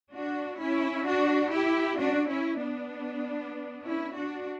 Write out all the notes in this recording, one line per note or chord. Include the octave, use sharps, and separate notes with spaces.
D4 F#4
C#4 E4
D4 F#4
E4 G4
D4 F#4
C#4 E4
B3 D4
C#4 E4
D4 F#4